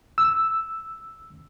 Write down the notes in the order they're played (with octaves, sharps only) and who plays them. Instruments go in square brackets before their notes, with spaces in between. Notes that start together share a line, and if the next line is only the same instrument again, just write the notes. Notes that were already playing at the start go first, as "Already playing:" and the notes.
[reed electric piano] E6